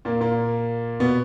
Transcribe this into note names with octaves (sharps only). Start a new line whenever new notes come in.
A#2 A#3
A#2 A#3
B2 B3